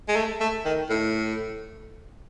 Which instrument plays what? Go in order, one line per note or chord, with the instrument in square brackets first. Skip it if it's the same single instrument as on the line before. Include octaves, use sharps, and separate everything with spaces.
[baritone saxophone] G#3
A3
A3
D#3
A2